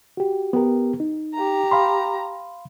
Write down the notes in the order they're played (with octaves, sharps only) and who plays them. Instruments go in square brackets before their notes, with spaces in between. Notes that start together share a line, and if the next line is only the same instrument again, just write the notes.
[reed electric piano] F#4 G4
B3 G4 A#4
D#4
[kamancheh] G4 A#5
[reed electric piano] F5 B5 C6